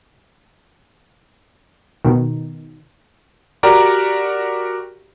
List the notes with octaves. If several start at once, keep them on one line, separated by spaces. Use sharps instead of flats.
B2 D#3
F#4 G4 A#4 D5 A#5